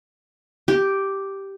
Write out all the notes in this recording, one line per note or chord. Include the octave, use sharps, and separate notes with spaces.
G4